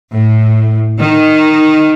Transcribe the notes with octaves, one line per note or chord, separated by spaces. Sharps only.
A2
D#3